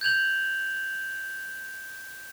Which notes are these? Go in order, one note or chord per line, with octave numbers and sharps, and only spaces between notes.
G6 G#6 F7 F#7